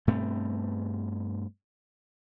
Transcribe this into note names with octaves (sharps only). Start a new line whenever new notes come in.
G2 B2 A3 C4